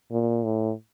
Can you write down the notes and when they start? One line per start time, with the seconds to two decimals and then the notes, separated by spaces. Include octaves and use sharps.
0.12 A#2
0.44 A2